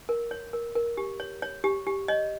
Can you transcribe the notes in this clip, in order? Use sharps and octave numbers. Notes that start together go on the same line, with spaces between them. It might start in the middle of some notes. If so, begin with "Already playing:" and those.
A#4
C#5
A#4
A#4
G4
C#5
C#5
G4
G4
C#5 D#5